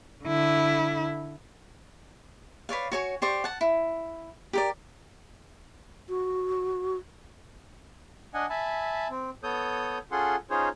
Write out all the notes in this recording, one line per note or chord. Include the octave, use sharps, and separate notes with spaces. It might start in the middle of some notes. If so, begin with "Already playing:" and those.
D3 E4
B4 C#5 D5 F5
F#4 C#5 G#5
G4 C5 D5 C#6
F#5 A5
E4
G4 A#4 D5
F#4
D4 D#5 F#5 G#5
E5 G#5 A5 B5
C4
B3 A4 C#5 D#6 G6
C#4 F4 G#4 A4 F#5 C6
C#4 D#4 F4 G#4 C5 C#5